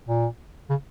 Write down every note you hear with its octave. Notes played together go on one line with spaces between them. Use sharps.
A#2
C#3